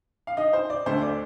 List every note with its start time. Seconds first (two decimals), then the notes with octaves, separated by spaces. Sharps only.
0.27 F5
0.37 D#4 D#5
0.53 C5
0.70 D5
0.86 D2 D3 A3 C5
1.02 D5